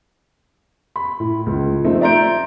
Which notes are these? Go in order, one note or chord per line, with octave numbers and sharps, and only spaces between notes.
B5
A2
C#2
F3 A3 C4 D#4
D5 E5 A#5 C6 G6 D7